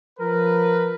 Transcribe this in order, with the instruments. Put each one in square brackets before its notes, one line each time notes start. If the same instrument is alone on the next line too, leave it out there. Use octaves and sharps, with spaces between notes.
[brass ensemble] F3 B4 [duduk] A#4